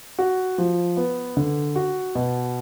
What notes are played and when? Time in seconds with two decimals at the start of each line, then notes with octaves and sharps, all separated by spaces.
0.19 F#4
0.58 F3
0.97 B3
1.37 D3
1.76 F#4
2.15 B2